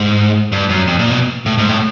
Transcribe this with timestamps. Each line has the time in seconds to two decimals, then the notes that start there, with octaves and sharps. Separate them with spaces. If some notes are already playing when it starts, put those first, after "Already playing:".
Already playing: G#2
0.52 G2
0.70 F#2
0.87 F2
0.99 A#2
1.11 B2
1.46 A2
1.58 G#2
1.69 A2